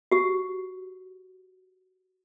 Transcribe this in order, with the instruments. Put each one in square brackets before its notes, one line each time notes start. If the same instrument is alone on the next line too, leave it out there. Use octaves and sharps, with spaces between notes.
[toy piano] F#4 G4